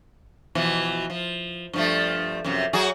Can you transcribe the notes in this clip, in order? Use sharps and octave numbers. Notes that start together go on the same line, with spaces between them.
B2 E3 F3
F3
G2 F3 A3
F#2 C3 F3
F#3 F#4 G#4